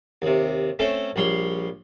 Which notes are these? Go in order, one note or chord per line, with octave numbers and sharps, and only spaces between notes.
D#2 C3
A3 C4 C#4 A4
A#1 G3 C#5 C6